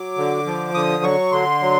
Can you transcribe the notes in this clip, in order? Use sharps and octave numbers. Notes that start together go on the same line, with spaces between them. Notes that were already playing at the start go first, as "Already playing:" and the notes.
Already playing: F#3 D6
D3
F3
D3 D#6
F#3 C#6
D3 C6
F#3